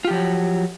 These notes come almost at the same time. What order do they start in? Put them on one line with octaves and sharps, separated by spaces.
F4 G4 F3 F#3